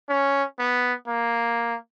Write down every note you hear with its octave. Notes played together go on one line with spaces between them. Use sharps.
C#4
B3
A#3